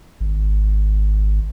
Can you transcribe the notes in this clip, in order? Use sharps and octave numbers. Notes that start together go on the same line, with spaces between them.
G#1